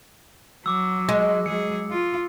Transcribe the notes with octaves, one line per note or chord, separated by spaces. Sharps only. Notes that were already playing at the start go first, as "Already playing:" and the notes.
F#3 D6 E6
G#3
F#3 G#4 C#7
F4